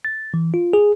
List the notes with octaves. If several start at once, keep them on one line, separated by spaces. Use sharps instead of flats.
A6
E3
F4
G#4